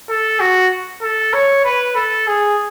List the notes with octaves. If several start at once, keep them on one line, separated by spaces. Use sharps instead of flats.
A4
F#4
A4
C#5
B4
A4
G#4